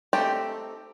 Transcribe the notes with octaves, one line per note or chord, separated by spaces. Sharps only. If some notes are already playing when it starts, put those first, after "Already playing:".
A3 C4 D#4 G4 A4